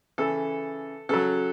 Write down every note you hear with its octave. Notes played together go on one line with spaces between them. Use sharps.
C#3 E3 A4
C#3 F#3 A4